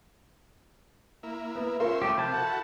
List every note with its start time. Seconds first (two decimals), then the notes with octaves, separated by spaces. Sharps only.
1.23 A#3 E4
1.55 B3
1.80 C#4 F4 A#4 C5 E5
2.02 A3 G4
2.17 C3 F3 E4 A5 G6
2.34 F#4 A4